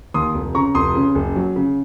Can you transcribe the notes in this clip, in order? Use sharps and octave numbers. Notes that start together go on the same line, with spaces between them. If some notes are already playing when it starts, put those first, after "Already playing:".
D#2 C6 D#6
F1
C#3 A#5 C#6
F1 C6 D#6
C#3
F#1
F#3
C#3